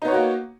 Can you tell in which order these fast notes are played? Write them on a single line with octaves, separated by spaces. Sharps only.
D#4 B3 C#5 F#4 A#3